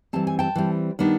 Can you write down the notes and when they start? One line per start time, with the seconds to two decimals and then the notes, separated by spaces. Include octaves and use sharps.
0.13 E3 G3 C4 A5
0.27 G#5
0.39 G5 A5
0.56 E3 G3 C4
0.99 D#3 G3 B3 D4